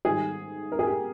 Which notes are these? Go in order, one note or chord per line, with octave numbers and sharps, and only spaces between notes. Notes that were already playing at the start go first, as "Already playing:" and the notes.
G#2 D#3 G3 G#4
A#4
G#4
G4